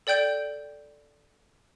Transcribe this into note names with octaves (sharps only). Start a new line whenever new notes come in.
A4 D5 G5 G6 D7